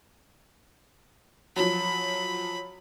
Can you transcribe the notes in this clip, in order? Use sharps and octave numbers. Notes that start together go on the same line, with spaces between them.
F3 F#3 B5